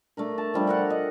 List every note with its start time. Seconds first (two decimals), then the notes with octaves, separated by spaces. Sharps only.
0.17 A3 D4 A#4
0.38 A5
0.54 F3 G3 D4
0.67 A4 A#4 F#5
0.90 D#5